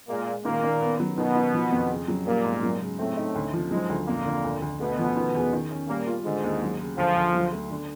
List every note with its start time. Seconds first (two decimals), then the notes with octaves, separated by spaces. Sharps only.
0.09 A#2 G#3 A#3
0.27 G#3
0.45 A#2 D#3 A#3
0.64 D#3
0.81 B3
1.00 F#3
1.17 B2 D#3 B3
1.36 D#3
1.54 F3
1.72 F2
1.90 C#3
2.08 F#3
2.26 A#2 G3 A#3
2.44 G#2
2.63 F#3
2.81 C#3
2.99 A2 A3 C4
3.17 D#4
3.35 D2
3.53 F3
3.71 G#2 F#3 G#3
3.89 D2
4.07 F2 A#2 A#3
4.25 D3
4.44 D2
4.62 D2
4.80 B2 A3 B3
4.99 F3
5.16 D#3
5.35 E2
5.53 D#3
5.71 C#4
5.88 A#2 G3 A#3
6.08 F4
6.25 G#2 D3 G#3
6.43 D#2
6.62 F#3
6.79 C#3
6.97 D2 F3
7.16 D2
7.34 F#3
7.52 A3
7.70 D3